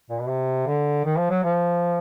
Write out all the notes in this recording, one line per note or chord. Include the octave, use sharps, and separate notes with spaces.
A#2
B2
C3
D3
D#3
F3
F#3
F3